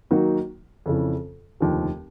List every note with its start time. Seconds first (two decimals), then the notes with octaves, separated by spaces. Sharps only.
0.11 D#3 F#3 A#3 D#4 F#4
0.86 F2 C#3 E3
1.60 F1 D#2 D3 F3